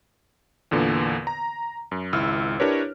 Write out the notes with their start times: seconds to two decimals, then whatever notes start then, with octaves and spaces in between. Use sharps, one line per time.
0.71 E2 A#2 D3 A#3 B3
1.27 A#5
1.91 F#2
2.13 G#1 C#2 E4 E6 F6
2.60 D4 E4 G4 A#4 B4 C#5